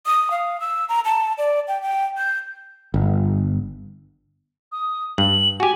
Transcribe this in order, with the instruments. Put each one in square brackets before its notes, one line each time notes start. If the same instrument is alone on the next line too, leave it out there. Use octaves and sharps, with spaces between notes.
[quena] D#6
F5
E6
A#5
A5
D5
G5
G5
G6
[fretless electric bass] G1
[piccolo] D#6
[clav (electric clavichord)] G2 [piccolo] F#7
[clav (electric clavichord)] F#4 G4 [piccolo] G#5